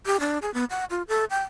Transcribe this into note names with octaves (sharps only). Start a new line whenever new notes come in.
G4
D4
G#4
B3
F#5
F4
A4
G5